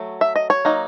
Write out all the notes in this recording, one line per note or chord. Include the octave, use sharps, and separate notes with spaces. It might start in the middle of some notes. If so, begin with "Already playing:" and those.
Already playing: F#3 A3
E5
D#5
C#5
F#3 A#3 D#4